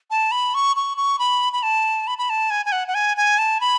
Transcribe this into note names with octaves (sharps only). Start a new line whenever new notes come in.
A5
B5
C#6
C#6
C#6
B5
B5
A5
B5
B5
A5
G#5
G#5
F#5
F#5
G#5
G#5
A5
B5